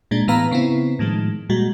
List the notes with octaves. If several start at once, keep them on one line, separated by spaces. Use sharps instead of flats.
A#2 G#3 D4
A2 E3 B3 B4 F5 A#5
C#3 B3 C4 E4
A2 D#3 F3 G#3
A#2 G3 G#3 F#4